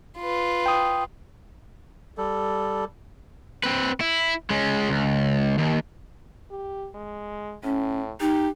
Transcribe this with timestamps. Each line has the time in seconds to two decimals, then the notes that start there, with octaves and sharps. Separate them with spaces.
0.19 F4 B4
0.66 G5 D#6
2.18 G3 A4
3.64 C4 B4
4.01 E4
4.50 G#3 C#4
4.89 C#2
5.58 D#2
6.51 G4
6.95 G#3
7.64 A2 C#4
8.21 D#4 G4